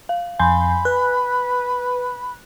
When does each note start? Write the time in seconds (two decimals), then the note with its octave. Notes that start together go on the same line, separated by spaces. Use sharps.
0.09 F5
0.39 F2 G#5 B5 C6 G6
0.85 B4 F#6